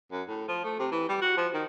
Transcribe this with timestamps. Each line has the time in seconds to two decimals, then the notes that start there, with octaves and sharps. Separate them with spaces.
0.12 F#2
0.28 A2
0.48 F3
0.64 A3
0.79 C3
0.92 E3
1.09 G3
1.22 F#4
1.37 F3
1.54 D#3